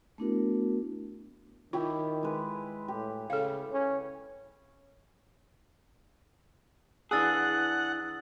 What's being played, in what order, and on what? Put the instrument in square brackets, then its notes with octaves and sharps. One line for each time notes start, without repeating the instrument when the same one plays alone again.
[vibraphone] A3 B3 D4 E4 F#4 A#4
[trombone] D#3 [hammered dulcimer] E4 G4 [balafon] F4
[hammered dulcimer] G#3 B4
[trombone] A2 [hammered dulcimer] G4
[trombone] C#3 [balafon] A4 F5
[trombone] C#4
[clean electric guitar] E3 D4 G#4 [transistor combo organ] F#5 [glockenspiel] D#6 E6 A6